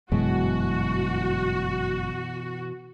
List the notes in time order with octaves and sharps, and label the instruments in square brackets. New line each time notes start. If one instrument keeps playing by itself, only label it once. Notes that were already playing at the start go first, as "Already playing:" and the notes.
[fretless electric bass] G1 F#2 G#3 [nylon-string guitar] B2 E3 [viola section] F#4